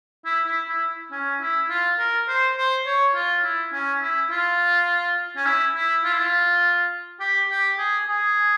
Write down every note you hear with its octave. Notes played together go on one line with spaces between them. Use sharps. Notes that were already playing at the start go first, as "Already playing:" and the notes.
E4
E4
E4
C#4
E4
F4
A#4
C5
C5
C#5
F4
E4
C#4
E4
F4
C#4
E4
E4
F4
E4
F4
G4
G4
G#4
G#4